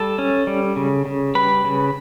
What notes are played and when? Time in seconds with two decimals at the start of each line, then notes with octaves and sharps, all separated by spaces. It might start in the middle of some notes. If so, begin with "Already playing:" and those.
Already playing: G3 A4 A5
0.18 C#4
0.47 G3
0.76 C#3
1.06 C#3
1.35 G3 B4 B5
1.64 C#3